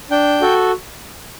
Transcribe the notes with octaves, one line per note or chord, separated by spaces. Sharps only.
D4 G5
F#4 A4